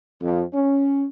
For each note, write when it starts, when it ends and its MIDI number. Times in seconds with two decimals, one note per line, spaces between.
0.21 0.43 41
0.53 1.06 61